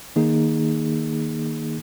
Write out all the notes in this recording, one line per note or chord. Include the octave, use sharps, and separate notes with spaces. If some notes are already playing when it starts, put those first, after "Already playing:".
D#3 A#3 D#4 G#4